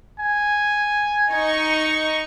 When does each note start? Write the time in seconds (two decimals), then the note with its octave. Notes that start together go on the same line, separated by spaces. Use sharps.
0.20 G#5
1.32 D#4 C#6